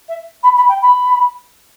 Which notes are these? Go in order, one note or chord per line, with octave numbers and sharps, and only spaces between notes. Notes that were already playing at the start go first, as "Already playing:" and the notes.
E5
B5
B5
G5
B5